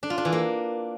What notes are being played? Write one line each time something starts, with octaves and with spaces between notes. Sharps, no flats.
D4
F4
D4
E3
A#3